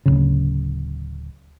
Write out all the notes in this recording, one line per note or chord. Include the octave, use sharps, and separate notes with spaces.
D1 A#1 C#3